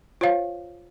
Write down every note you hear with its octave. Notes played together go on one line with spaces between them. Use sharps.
F4 C5 C#5 F5